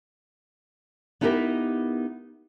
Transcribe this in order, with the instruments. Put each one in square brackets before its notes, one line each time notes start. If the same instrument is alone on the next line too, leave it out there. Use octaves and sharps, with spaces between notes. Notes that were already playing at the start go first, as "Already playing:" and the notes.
[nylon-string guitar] B3 D#4 E4 G4 A4 A#4